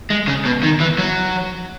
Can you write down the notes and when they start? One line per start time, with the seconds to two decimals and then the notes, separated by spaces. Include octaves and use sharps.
0.10 G#3
0.28 C#3
0.45 B2
0.63 D#3
0.80 E3
0.99 F#3